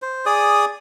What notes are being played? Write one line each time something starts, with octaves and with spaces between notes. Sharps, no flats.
C5
G#4 D5 D#6